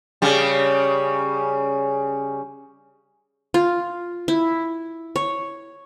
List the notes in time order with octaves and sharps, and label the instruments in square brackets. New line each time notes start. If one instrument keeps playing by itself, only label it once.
[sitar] C#3 G3
[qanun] F4
E4
C#5